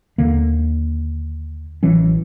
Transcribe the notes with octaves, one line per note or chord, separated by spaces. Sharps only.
D#2 D3 A#3
A1 E3 F#3 C#4